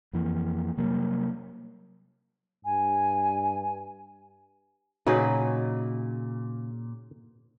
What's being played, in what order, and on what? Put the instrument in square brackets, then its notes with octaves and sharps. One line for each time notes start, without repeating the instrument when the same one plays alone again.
[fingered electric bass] F2 E3 A#3
C3 F#3 G3 A#3
[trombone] G2 [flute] G#5
[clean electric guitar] A#2 [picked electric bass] C#3 [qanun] F#3 B4 [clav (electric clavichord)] D#4 G#4